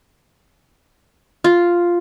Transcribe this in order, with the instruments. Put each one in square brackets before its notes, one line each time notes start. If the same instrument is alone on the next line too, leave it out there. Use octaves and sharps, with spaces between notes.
[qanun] F4